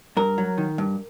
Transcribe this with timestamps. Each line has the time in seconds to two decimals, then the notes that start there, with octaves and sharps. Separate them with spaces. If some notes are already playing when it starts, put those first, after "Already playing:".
0.17 G2 A#4
0.38 F#3
0.58 D#3
0.78 G2